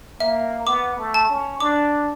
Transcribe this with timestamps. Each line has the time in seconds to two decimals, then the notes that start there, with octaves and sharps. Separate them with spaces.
0.20 A#3 E5
0.67 B3 D6
0.98 A3
1.14 A5
1.30 C#4
1.60 D4 D6